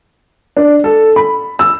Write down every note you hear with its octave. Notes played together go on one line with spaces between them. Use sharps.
D4
A4
B5
E6